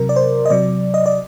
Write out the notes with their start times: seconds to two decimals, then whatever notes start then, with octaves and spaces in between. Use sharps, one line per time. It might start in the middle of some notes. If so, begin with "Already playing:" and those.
Already playing: C3 F#3 A#4
0.09 D5
0.16 C5
0.46 D#5
0.50 C3 F#3 D5
0.94 D#5
1.06 D5